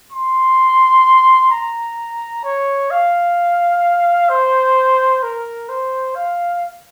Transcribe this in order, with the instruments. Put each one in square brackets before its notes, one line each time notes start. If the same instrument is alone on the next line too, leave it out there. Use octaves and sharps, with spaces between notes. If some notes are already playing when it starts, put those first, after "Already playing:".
[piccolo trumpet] C6
A#5
C#5
F5
C5
A#4
C5
F5